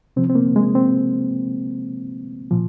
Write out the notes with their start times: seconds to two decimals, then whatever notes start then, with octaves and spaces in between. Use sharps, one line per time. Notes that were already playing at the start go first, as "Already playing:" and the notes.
0.16 C3 F3 C4
0.30 C4
0.35 A#3
0.56 G#3
0.75 C4
2.51 A#2 F3